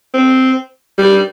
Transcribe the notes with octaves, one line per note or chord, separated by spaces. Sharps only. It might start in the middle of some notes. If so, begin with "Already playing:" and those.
C4
G3